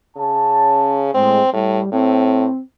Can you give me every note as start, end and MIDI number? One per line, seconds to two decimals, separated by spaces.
0.17 1.12 49
0.17 1.06 61
0.17 1.06 73
0.17 1.06 81
1.14 1.40 45
1.14 1.40 56
1.14 1.53 60
1.53 1.79 45
1.53 1.92 55
1.92 2.46 45
1.92 2.61 60